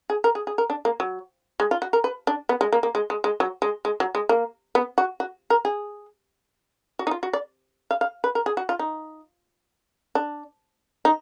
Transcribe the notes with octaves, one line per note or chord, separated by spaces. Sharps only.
G#4
A#4
G#4
G#4
A#4
D4
A#3
F#3
G#3
F4
F#4
A#4
B4
D4
B3
G#3
A#3
A#3
G#3
G#3
G#3
F#3
G#3
G#3
F#3
G#3
A#3
B3
F#4
F#4
A#4
G#4
F#4
D#4
F4
F#4
D5
F5
F5
B4
A#4
G#4
F#4
F4
D#4
D4
D#4